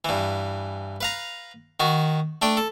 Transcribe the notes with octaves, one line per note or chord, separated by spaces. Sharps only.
G2 E3
B4 F5 A#5
D#3 F#4
A3 D4 G5
A4